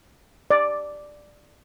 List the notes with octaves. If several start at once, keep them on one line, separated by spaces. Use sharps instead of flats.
D5